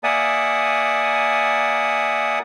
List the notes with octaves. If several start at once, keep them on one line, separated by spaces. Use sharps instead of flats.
A#3 D5 E5 F#5 G#5 D#6